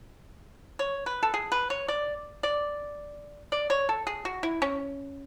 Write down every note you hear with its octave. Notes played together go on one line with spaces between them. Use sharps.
C#5
B4
A4
G#4
B4
C#5
D5
D5
D5
C#5
A4
G#4
F#4
E4
C#4